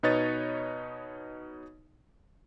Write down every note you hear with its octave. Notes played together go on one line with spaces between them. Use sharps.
B2 D#4 B4 C#5 D#5 A6